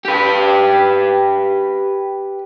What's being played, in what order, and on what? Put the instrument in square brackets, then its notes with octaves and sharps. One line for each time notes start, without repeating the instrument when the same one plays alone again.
[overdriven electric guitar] G4 B4